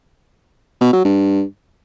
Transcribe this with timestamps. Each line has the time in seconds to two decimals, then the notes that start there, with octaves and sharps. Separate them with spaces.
0.81 B2
0.93 F#3
1.05 G2